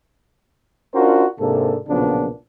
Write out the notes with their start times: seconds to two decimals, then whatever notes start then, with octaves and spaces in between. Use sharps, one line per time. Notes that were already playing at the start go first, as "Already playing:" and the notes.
0.94 C#4 D4 F4 F#4 A#4 C5
1.39 G#2 C3 A#3 D4 A4
1.89 B1 A#2 C#3 F3 B3 D4